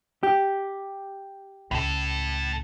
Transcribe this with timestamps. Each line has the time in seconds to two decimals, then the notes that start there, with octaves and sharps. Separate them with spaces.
0.23 G4
1.71 C#2 A2 A4